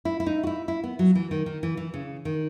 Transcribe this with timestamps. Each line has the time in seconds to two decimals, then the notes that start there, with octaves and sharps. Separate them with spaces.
0.05 E4
0.20 E4
0.26 D#4
0.43 F#4
0.47 E4
0.68 E4
0.84 B3
0.99 F#3
1.15 E3
1.31 D#3
1.46 D#3
1.63 E3
1.77 E3
1.94 C#3
2.25 D#3